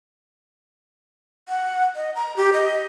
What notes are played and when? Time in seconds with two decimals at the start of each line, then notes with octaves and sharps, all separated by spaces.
1.49 F#5
1.96 D#5
2.15 A#5
2.37 G4
2.53 D#5